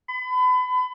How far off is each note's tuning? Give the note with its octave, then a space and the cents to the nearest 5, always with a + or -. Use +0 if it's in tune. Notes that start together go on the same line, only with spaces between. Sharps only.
B5 +35